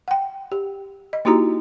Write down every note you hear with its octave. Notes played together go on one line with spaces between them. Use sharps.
F#5 G5
G4
D#5
A#3 D#4 E4 F#4 G4 A#5